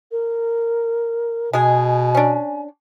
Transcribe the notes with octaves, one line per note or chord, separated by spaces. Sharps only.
A#4
B2 G#3 G#4 G#5
C#4 D4